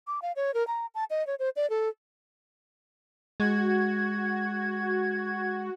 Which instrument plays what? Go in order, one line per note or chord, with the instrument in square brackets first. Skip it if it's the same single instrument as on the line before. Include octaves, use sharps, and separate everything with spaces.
[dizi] D6
F5
C#5
A#4
A#5
A5
D#5
C#5
C5
D5
A4
[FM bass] G#3 [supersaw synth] F#4 [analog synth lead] G#6